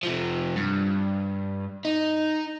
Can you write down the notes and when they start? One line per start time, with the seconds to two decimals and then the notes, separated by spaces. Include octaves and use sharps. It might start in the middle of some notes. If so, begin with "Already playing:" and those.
0.03 C3 F3
0.56 G2
1.85 D#4